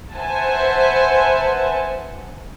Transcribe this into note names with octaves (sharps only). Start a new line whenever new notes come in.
B4 C5 E5 F#5 G#5 A5